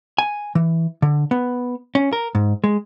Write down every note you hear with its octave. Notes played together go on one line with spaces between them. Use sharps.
G#5
E3
D3
B3
C#4
A#4
G#2
G#3